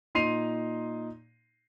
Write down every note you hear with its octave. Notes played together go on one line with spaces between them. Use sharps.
A#2 D#4 C6 C7 D#7 F7